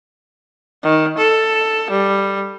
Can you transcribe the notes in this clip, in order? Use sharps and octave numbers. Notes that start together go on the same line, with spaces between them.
D#3
A4
G3